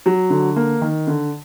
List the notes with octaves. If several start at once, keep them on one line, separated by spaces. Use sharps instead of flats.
F#3
D3
A#3
D#3
D3